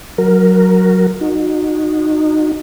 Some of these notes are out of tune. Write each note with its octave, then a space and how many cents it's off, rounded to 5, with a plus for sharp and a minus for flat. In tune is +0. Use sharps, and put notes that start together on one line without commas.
F#3 +0 F#4 +0 A#4 +0
D#4 -20 F#4 -25